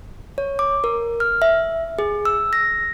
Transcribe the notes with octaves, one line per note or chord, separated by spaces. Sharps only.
C#5
D6
A#4
F6
E5
G#4
E6
A#6